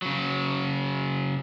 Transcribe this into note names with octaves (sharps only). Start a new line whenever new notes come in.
C#3 F#3